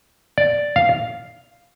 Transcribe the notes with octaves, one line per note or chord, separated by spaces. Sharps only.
D5
F5